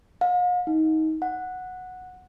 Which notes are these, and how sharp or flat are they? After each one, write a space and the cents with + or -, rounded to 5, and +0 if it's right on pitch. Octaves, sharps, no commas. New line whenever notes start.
F5 +45
D#4 +25
F#5 -10